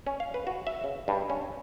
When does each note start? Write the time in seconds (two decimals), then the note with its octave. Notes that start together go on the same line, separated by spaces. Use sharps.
0.07 C#4
0.20 F5
0.34 B4
0.47 F#4
0.67 E5
0.84 C#3
1.08 G2
1.30 C#4